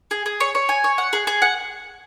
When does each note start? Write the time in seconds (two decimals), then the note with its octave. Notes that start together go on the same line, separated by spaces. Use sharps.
0.11 G#4
0.26 G#4
0.40 C#5
0.55 C#5
0.69 G#5
0.84 C#5
0.98 F#5
1.13 G#4
1.27 G#4
1.42 F#5